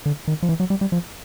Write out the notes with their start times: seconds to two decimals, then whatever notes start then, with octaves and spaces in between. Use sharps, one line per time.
0.06 D3
0.28 D#3
0.43 F3
0.49 E3
0.60 F#3
0.70 G3
0.81 G3
0.92 F3